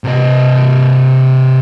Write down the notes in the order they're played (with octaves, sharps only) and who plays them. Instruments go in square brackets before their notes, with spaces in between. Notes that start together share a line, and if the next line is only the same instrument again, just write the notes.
[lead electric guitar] C3 D#5